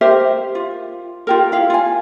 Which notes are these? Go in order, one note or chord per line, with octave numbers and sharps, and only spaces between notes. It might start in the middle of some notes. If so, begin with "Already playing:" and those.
G4 A#4 C5 E5
F4
F4 G4 A#4
E4 F5
F4 G#5